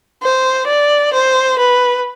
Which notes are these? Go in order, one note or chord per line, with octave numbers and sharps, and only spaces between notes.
C5
D5
C5
B4